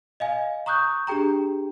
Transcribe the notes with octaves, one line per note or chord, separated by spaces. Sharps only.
D#5 F5 G#5
A#5 C#6 D#6 F#6 G6
D4 G4 G#4 G5 A#5